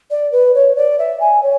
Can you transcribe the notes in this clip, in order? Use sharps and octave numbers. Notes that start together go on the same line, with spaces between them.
D5
B4
C#5
D5
E5
G#5
C#5